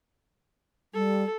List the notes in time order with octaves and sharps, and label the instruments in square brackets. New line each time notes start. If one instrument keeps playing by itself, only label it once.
[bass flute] G3 [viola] A4